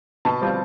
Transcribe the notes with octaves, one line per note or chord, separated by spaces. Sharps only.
B2 A5
G3 C4 F4